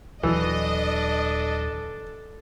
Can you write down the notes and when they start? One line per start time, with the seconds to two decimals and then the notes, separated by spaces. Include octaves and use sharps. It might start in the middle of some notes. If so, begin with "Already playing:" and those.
0.23 D#1 E3 F#3 D4 A4 D#5